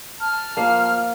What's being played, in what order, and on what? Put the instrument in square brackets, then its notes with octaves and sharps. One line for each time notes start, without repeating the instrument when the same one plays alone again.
[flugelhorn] A5 [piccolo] F6
[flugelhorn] F3 [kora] A#3 F5